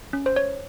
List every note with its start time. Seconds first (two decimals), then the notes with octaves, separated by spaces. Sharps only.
0.13 C#4
0.26 C5
0.36 C#5